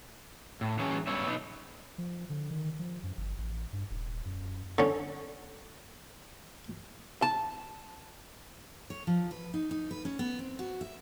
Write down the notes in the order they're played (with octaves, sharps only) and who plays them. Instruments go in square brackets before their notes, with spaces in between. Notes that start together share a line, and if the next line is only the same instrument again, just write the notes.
[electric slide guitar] A2
E3 F#3 G#3 C#4 C#5
G2 B3 C#5 E5
B2 B3 D#4
[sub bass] F3
D3
D#3
F3
F#2
G1
A1
G2
D#1
F#2
[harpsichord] D3 C#4
[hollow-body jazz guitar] A5
[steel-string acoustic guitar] C#5
F3
B4
D#4
D#4
B4
C#4
B3
C4
F#4
E5